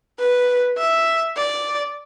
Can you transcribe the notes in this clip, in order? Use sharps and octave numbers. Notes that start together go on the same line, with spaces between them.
B4
E5
D5